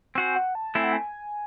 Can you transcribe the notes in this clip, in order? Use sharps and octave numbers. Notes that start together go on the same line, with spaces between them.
C4 F#4 C5 G#5
F#5
A5
A3 C4 E4 G#5
F#5
G#5